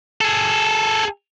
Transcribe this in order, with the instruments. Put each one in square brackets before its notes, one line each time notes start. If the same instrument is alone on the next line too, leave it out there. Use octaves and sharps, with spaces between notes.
[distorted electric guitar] G#4 A4